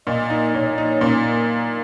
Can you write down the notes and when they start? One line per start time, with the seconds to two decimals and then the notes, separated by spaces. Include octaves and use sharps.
0.07 A#2 D#5
0.30 D#4
0.54 A#2 C#5
0.78 D#4
1.01 A#2 C#4